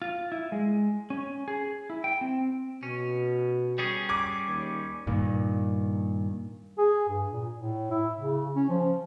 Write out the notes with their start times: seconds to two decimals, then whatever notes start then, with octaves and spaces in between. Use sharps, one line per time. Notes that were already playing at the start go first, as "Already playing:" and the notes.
0.02 F4
0.32 E4
0.52 G#3
1.10 C#4
1.48 G#4
1.90 E4
2.04 G5
2.21 C4
2.83 B2 C#4
3.78 G3 C#4 G#4
4.09 D6 G#6
4.48 D#2
5.07 G2 A#2 D#3
6.78 G#4
7.09 G2
7.31 A#2
7.54 A2
7.91 E4
8.17 C#3
8.56 C#4
8.69 F3